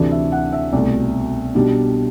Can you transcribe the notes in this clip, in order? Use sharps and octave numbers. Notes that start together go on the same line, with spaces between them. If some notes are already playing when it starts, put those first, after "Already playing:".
Already playing: D2 C3 E3 A3 D4 D5
E5
F#5
E5
C2 B2 A3 D5
B2 G3 D4